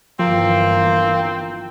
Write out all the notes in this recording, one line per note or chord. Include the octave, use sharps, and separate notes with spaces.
G1 G2 E3 F3 A#3 C4